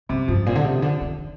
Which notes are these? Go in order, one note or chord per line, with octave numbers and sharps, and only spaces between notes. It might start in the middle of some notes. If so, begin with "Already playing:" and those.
F2 C3
G2 F3
A#2 F3
D3
C3
D3
D#3
D#3